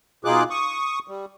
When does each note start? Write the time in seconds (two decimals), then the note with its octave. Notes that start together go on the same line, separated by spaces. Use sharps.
0.25 B2 D#4 F4 G#4 D6 F#6
0.50 C#6 D#6
1.08 G3